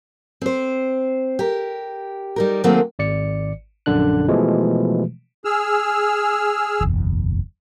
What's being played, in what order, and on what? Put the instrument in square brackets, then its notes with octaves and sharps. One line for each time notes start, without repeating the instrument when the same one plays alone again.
[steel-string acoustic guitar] C4 C5
G4 A#4
G3 D#4 A#4
D#3 F#3 A3 A#3 C4 G#4
[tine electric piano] G#1 D5 C#7
A#1 F#2 D3 D4 F#6
B2 E3 F3 G#3 A3
[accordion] G#4 E6 F6
[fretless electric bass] F#1 B1 E2